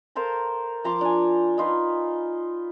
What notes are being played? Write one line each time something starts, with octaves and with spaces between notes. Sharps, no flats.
A4 A#4 C5 F5
F3 A#5 C6 D6
D4 G#5
D#4 F4 B4